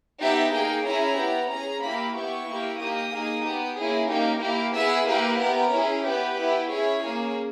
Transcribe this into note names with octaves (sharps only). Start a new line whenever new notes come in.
B3 D#4 G4 E5
A#3 D#4 G#4 G5
C#4 E4 G#4 A#5
B3 G4
C#4 G#4 A#5
A#3 E4 G4 B5
B3 E4 G4 C#6
A#3 E4 G4
A#3 D#4 G4 D#6
A#3 D#4 G#4
B3 G4
A#3 C#4 E4 G#4
A#3 D#4 G4
A#3 E4 G4
B3 E4 G#4 E5
A#3 E4 G4 B4
B3 G4 A#4
C#4 E4 G#4
B3 G4 B4
B3 E4 G4
C#4 E4 G#4 C#5
A#3 C#4 G#4